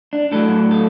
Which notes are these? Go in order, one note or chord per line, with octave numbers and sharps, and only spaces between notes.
D4
A2 F#3 A4
A4